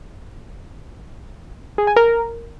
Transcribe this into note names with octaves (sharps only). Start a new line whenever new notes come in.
G#4
G#5
A#4